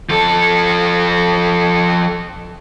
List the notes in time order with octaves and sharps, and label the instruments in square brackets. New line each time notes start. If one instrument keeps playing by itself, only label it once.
[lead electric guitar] F3 A4